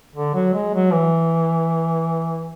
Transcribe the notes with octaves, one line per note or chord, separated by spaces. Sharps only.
D3
F#3
G#3
F#3
E3